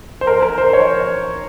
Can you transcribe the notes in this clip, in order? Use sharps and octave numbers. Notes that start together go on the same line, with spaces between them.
C5
A#4
A#4
C5
C#5